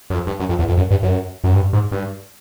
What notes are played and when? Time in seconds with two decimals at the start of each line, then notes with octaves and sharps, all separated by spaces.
0.10 F#2
0.14 F2
0.27 G2
0.40 F#2
0.49 F2
0.59 E2
0.69 F2
0.77 F#2
0.91 G2
1.03 F#2
1.44 F#2
1.54 G2
1.73 G#2
1.92 G2